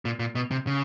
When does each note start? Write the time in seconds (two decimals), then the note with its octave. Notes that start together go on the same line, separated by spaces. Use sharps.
0.05 A#2
0.19 A#2
0.35 B2
0.51 C3
0.67 C#3